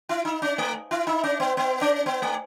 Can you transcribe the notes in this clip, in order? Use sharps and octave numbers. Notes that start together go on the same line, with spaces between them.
E4
D#4
C#4
A3
E4
D#4
C#4
B3
B3
C#4
B3
A3